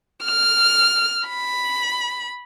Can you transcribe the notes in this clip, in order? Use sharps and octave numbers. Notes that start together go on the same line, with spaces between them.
F6
B5